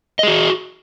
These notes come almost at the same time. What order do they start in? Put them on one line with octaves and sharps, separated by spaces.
D#5 G#4 F#4